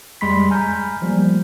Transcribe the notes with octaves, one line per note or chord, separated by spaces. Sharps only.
F2 G3 G#3 B5 C6 B6
G#5 A#5 F6 G6
F3 G3 A3 A#3